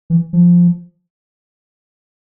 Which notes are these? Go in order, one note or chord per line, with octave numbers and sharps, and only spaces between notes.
E3
F3